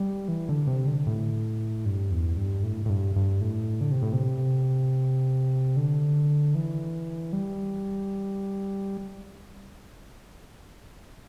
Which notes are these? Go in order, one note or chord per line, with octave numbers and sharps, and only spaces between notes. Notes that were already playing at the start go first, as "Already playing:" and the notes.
Already playing: G3
E3
D3
C3
D3
A2
G2
E2
G2
A2
A2
G2
G2
A2
D3
C3
A2
C3
D3
E3
G3